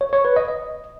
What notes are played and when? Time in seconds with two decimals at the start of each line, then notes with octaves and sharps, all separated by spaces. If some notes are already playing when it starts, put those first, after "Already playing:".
0.01 C#5
0.13 C#5
0.25 B4
0.36 D#5
0.48 D#5